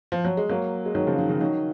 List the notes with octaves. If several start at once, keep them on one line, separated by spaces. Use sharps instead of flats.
F3
F#3
G#3
F#3 A#3
G#3
D#3 F#3
C#3 F3
D#3
C#3
D#3 F#3